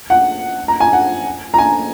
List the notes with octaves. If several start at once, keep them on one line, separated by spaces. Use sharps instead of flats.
F#5
A#5
G#5
F#5
A#5
G#5